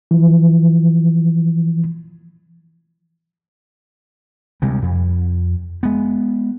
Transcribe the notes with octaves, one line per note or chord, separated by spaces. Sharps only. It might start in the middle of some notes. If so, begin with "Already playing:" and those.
E3 F3
D2 C3 G3 G#3
F2
G#3 B3